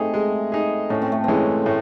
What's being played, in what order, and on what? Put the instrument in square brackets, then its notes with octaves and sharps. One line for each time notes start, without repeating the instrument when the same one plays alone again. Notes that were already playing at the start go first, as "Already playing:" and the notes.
Already playing: [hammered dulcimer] A3 C4 [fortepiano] D#4 G#4
[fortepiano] G#3
D#4 G#4
[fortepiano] A2 [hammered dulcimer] C#4
[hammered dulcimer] C4
A3
[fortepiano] E3 G#3 C#4 [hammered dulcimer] C4
[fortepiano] A2